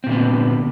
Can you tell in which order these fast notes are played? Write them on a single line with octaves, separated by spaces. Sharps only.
C4 A#2 D3 B3